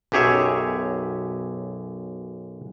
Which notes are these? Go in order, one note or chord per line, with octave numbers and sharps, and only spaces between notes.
B1 F#2 G4 G#4 C#5 E5